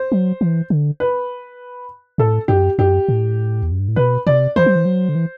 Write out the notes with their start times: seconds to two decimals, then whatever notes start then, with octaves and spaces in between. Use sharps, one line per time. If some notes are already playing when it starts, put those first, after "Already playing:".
Already playing: C5
0.12 F#3
0.41 E3
0.70 D3
1.00 B4
2.18 A2 A4
2.48 F#2 G4
2.79 F#2 G4
3.08 A2
3.63 E2
3.72 F#2
3.79 G2
3.88 A2
3.96 B2 B4
4.27 C3 D5
4.56 E3 C5
4.66 F#3
4.76 E3
4.85 F#3
5.09 D3
5.15 E3